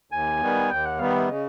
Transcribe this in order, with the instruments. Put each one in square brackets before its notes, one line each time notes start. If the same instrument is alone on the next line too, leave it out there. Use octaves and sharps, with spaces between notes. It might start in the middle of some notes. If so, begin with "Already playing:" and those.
[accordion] D#2 [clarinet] G#5
[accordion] D#3 G3 B3
[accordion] D#2 [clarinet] G5
[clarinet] F#5
[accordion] D#3 G3 B3 [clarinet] F5
[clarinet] E5
[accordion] C#3 [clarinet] D#5